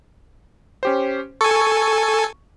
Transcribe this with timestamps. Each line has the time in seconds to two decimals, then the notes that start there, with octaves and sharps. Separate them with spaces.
0.83 C#4 G4 C5
1.41 A4 G#5 C#6